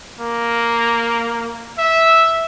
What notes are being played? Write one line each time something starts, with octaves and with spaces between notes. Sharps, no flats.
A#3
E5